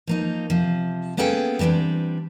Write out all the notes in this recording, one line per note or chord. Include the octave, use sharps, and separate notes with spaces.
F3 A#3 D#4
C3 F3
A#3 B3 C#4 G#4 A4 G5
E3 G3 A3 C4 D4